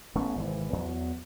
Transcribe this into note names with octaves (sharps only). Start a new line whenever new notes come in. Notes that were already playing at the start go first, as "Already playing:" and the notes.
A1 A3 B3 C#4
G#1 C3 E3
E2 F#3